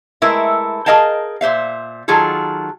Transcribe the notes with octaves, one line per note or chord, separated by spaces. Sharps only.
G#3 A3 E4 A#4 B4 E5
G#4 A#4 D#5 F5 G5 A5
A#2 C5 E5 F5
D#3 F#3 F4 G#4 A4